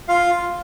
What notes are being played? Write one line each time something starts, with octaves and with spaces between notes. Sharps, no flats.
F4 F5